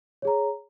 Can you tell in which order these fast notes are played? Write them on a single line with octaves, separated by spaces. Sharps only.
C#5 G#4 A#5